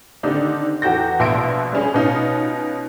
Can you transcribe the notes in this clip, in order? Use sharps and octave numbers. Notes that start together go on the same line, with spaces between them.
D3 D#3 C4 D#4 G4 D5
E2 F#4 A4 G5 G6 A#6
A#1 B2 E5 C6 A#6 D7
G3 C#4 G#4
B2 C#4 D#4 F4